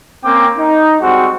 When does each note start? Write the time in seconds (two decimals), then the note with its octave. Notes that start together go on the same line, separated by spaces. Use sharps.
0.24 A#3 C4 C#4 G5 D6
0.59 D#4
1.02 G3 G#3 C4 F#4